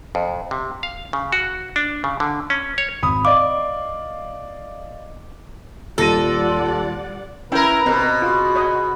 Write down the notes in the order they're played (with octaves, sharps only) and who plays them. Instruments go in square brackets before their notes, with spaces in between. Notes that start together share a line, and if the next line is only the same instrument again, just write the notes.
[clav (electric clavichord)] F2
C3
F5
C#3
F#4
D4
C#3
D3
C#4
C#5
[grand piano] G#1 B5 D#6
[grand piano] D5 D#5 F5 [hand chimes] D6
[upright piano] D#1 A#6 D#7 [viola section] G3 D5 F#5 [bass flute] F4 [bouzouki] A4
[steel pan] C#4 G5 [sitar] E4 A#4 [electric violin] B4 A#5
[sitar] B2 [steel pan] C4 A#4
[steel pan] F4 [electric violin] F#4 G#4
[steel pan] C#5 D#5